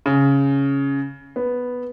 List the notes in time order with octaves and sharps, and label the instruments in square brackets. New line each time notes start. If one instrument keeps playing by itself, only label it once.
[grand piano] C#3
B3